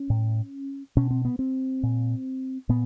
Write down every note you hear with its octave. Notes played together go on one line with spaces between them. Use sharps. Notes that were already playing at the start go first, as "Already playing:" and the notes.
Already playing: C#4
A2
B2 C#4
C4
B3
C4
A#2
A#2 B3